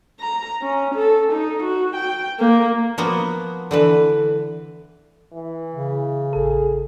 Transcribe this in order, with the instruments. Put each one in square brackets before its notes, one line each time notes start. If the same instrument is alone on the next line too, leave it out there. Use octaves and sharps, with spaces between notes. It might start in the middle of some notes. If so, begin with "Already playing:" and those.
[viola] A#5
C#4
A4
D#4
F#4
G5
A#3
[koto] F3 A#3 B3 F#4
D3 E3 B4
[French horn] E3
[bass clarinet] C#3
[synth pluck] A1 A4 [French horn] G#4